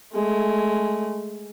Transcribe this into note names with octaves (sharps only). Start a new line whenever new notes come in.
G#3 A3